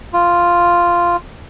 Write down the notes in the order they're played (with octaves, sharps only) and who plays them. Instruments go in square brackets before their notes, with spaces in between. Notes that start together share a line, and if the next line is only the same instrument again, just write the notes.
[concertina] F4